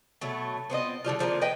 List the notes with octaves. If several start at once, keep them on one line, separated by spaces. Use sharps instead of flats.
B2 F#3 A3
B3 C4 F4 D#5
D3 F3 G3 F4
D3 F3 G#3 A#3
B4 D#5 G5